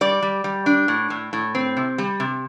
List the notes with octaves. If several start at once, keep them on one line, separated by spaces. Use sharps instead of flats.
G3 D5
G3
G3
D4
A2
A2
A2
C4
C3
G3
C3